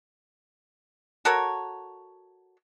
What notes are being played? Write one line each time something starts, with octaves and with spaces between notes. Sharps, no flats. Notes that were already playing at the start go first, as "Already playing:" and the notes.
F#4 A4 A#4 C#5